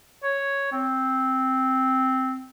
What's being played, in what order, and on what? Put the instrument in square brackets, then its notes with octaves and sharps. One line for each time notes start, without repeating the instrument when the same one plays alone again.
[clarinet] C#5
C4